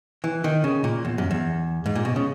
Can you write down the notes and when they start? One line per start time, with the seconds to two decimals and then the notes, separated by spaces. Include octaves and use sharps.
0.24 E3
0.44 D#3
0.64 C#3
0.84 A#2
1.05 E2
1.18 F#2
1.31 E2
1.86 G#2
1.95 A#2
2.05 B2
2.16 C#3